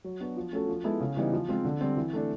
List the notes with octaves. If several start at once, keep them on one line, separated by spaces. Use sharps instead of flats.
F#3
B3 D4 F#4
F3
A3 C#4 F#4 A4
F3
G#3 B3 E4 A4
C#3
E3 G3 B3 D#4
F3
G#3 C4 F4
D3
G3 C4
E3
A3 D4